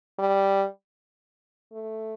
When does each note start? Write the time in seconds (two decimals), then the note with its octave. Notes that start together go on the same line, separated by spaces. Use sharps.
0.19 G3
1.73 A3